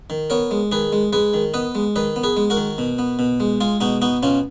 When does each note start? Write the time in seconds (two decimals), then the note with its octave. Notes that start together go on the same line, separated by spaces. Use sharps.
0.10 D#3
0.30 B3 A#4 C#5
0.51 G#3
0.72 D#3 G#4 B4
0.93 G#3
1.13 G#3 G#4 B4
1.34 D#3
1.54 B3 B4 D#5
1.75 G#3
1.96 D#3 B4 D#5
2.16 B3
2.24 G#4 B4
2.37 G#3
2.50 F#4 A#4
2.57 D#3
2.78 B2
2.99 B3
3.19 B2
3.40 G#3
3.61 G#3 F4 G#4
3.81 B2 D#4 F#4
4.02 B3 D#4 F#4
4.23 B2 C#4 F4